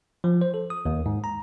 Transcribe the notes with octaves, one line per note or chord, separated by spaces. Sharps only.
F3
C5
A4
D#6
D#2
G#2
A#5